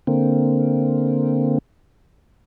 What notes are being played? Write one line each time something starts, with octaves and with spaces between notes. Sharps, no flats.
D3 A#3 C4